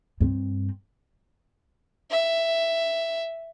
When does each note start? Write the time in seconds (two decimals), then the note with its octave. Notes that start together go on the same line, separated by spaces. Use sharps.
0.20 G2 C4
2.10 E5